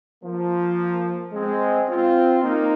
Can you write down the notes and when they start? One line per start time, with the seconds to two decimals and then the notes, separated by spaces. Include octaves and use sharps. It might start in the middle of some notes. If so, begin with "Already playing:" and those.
0.22 F3 A#3
1.32 G#3 C4
1.88 C4 F4
2.43 A#3 D#4